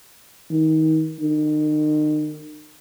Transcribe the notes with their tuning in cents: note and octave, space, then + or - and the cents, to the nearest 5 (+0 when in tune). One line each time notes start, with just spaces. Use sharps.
D#3 +25
D#3 -40